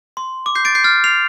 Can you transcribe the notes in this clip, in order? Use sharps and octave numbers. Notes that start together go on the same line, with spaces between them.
C6
D6
G6 C7
A6 D7
G6 C7
F6 A6
C7 F7